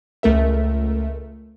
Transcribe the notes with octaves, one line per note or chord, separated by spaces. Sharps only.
C#2 A3 A#4 E5